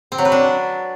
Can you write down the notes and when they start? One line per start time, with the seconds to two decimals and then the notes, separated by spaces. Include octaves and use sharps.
0.12 C4
0.18 F#3
0.25 B4
0.32 D4